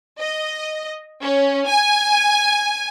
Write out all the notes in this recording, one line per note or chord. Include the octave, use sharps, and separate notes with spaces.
D#5
C#4
G#5